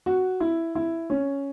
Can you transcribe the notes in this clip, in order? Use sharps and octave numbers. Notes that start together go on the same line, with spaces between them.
F#4
E4
E4
C#4